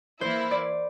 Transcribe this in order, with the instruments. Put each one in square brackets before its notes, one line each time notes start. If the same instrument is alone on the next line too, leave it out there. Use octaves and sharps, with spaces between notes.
[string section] E3 A#3 E4 [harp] C5
[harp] D5